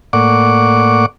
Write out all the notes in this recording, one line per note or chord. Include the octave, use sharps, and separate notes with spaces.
A2 A#3 D5 F#5 C#6 D6